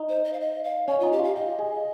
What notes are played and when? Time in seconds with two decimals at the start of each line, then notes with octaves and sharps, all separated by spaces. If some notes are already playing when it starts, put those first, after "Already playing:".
Already playing: D#4
0.09 C5
0.24 D#5
0.33 F5
0.40 D#5
0.64 F5
0.88 C#4 C#5
1.00 D#4 F4
1.12 G4
1.19 F4 F5
1.35 G4 D#5
1.59 G#4